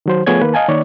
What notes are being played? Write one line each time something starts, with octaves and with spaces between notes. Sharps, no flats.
D#3 F#3 C5
F3 A3 B3 G#4 C#5 G#6
D#3 A#3 B4
D#5 F5 G#5 A5
D#3 A#3 C#5 D5